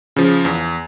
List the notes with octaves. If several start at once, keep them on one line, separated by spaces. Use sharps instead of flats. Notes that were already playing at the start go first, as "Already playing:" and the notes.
C#3 F3
E2